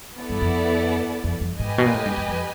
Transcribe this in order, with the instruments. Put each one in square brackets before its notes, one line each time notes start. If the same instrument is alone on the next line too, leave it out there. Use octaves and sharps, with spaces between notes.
[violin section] B3 E4 A4 D5
[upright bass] G2
F2
F2
F2
[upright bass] G#2 [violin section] G4 B4 D#5 G#5
[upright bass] B2
A#2
A2
G2
F#2
F2